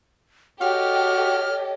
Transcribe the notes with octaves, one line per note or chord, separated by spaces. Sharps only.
F#4 G4 A4 C#5 D#5 F6